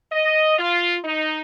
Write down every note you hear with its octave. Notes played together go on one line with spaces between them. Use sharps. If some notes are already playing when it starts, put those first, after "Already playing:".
D#5
F4
D#4